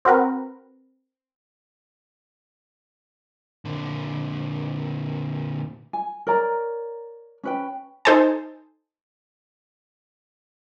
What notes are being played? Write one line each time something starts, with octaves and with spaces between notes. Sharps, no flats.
C4 F#4 A#4 B4
A#2 D3
G#5
A#4 C#5 D5 A#5
C#4 B4 G5
D#4 A4 C5 G#5 A5